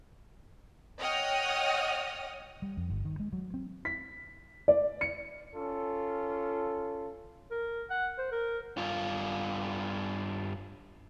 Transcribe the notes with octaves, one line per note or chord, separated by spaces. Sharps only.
C#5 D#5 F#5 G5 D#6 F6
G3
F2
G1
D#3
G#3
F#3
C4
B6
D5
C#7
C#4 F4 A4
A#4
F#5
C5
A#4
G2 F4